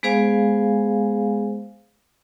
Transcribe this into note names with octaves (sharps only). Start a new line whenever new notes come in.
G#3 B3 G#4 C5 F5 G#5